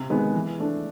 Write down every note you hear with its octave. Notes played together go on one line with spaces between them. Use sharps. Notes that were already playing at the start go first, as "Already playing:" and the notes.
Already playing: C3
D#3 G#3 B3
E3
A3 D4